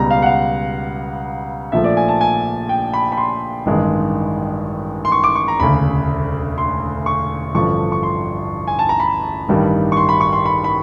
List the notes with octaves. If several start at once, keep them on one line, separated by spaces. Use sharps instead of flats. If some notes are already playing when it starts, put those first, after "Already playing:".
Already playing: C#2 B2 G3 A#5
F5
F#5
F5
A#1 A#2 F3 A3 E5
D5
G#5
A5
G#5
G5
B5
B5
C6
A1 G2 D#3 G#3
C6
C#6
D6
C#6
A#5
E1 D2 C#3 B5
C6
C#6
A1 G2 D3 F3 C#6
C#6
C6
G#5
A5
A#5
B5
A1 G2 D#3 G3
C#6
C6
B5
C#6
C6
B5
B5